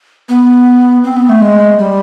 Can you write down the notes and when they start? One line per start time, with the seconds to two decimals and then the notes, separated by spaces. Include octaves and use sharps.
0.29 B3
1.04 C4
1.17 B3
1.29 A3
1.41 G#3
1.79 G3